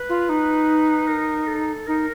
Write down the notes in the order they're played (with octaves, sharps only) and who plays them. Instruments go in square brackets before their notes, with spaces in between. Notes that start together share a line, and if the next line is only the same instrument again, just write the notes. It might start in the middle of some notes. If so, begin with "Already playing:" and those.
Already playing: [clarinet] B4
[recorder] F4
D#4
[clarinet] A#4
A4
[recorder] D#4 [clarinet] A#4